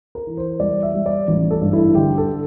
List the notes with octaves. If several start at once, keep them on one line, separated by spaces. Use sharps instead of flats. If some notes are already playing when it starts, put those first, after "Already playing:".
A#4
E3
C5
G3 D5
E5
G3
D5
A1
A4
G2
E4
D3 G4
A4